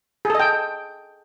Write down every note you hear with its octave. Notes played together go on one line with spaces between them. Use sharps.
G#4 A4 D#5 G5